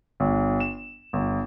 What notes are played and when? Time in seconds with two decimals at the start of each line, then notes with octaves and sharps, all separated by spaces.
0.20 G1
0.60 E7
1.13 G1